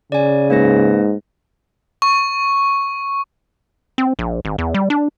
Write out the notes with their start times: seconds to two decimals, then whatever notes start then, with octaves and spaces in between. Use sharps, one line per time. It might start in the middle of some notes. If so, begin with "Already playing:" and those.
0.12 C#3 D5 G#5
0.50 G#2 A#3 B4 A#6
2.02 C#6
3.98 C4
4.19 A#1
4.45 G#1
4.58 E2
4.74 G3
4.90 D4